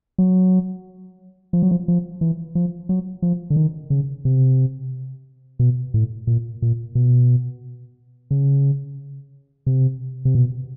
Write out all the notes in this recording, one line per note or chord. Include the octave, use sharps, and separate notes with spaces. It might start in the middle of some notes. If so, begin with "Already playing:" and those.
F#3
F3
F#3
F3
F3
E3
F3
F#3
F3
D3
D#3
C#3
C3
B2
A2
A#2
A#2
B2
C#3
C3
C3
B2